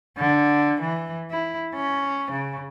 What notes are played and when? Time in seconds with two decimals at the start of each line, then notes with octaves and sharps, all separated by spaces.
0.17 D3
0.81 E3
1.31 E4
1.75 C#4
2.32 C#3